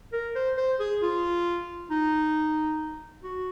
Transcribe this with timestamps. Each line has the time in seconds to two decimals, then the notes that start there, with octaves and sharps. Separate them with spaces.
0.13 A#4
0.35 C5
0.57 C5
0.80 G#4
1.02 F4
1.91 D#4
3.23 F#4